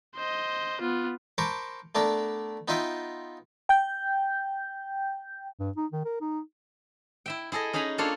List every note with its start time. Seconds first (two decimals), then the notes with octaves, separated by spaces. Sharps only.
0.16 C5 D#5
0.81 B3 F4
1.38 A#4 C5 A5 B5 C#6 D6
1.95 A3 B3 D4 A#4 A5
2.68 B3 D#4 F4 D#5 E5 G5
3.69 G5 G6
5.59 G2
5.77 D#4
5.92 D#3
6.05 A#4
6.21 D#4
7.26 E4 E5 G5
7.52 E4 G#4 A4 D#5
7.73 C#4 D#4 G#4 A#5 B5
7.98 A#3 D4 F4 A4 C#5